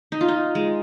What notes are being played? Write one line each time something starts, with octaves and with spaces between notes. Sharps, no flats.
D#4
F4
D#4
G#3